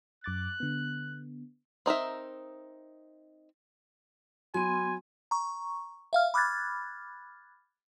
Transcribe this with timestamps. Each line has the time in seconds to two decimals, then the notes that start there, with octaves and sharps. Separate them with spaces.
0.24 F#2 D6 F#6 A6
0.60 D3 B3
1.86 C4 D#4 A#4 E5
4.54 F#3 B3 G#5 C6
5.31 A#5 C#6
6.13 E5 F5 F6
6.34 B5 D6 F6 F#6 G#6 A6